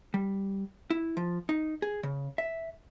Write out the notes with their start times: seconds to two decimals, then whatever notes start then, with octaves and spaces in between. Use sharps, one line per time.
0.14 G3
0.90 E4
1.17 F3
1.49 D#4
1.82 G#4
2.03 C#3
2.38 E5